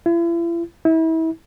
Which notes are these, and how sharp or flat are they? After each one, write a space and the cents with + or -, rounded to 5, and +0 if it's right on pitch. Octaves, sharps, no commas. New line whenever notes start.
E4 +45
E4 -30